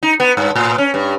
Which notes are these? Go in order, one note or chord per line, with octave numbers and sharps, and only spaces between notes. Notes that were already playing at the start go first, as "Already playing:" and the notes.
D#4
B3
G2
A2
C#4
G2